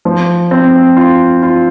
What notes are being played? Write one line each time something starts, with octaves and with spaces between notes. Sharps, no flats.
F3
C4
F4
F4